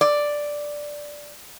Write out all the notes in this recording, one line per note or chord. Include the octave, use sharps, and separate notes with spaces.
D5